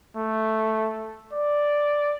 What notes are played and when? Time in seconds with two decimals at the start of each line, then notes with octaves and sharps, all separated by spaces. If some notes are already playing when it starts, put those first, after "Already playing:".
0.17 A3
1.33 D5